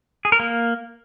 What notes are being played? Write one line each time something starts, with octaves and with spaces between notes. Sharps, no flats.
G#4
A#4
A#3